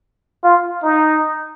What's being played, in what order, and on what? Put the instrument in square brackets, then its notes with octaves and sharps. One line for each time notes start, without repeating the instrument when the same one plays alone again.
[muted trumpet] F4
D#4